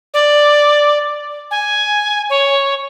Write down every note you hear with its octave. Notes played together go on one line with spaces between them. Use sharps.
D5
G#5
C#5